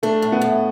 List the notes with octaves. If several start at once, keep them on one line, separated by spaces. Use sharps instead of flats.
A3 D4
A2
B3
A2